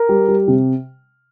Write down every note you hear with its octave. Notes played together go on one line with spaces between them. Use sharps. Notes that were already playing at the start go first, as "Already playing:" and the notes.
Already playing: A#4
G3
G3
C3